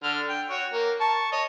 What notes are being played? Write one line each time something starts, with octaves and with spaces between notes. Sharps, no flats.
D3 F6
G5
F#4 C#5
A#3
A5 C#6
C#5 D#5